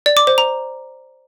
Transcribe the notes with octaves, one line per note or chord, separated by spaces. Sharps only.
D5
D6
C5
A#5